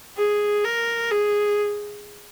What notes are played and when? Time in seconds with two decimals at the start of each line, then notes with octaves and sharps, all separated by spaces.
0.17 G#4
0.65 A#4
1.12 G#4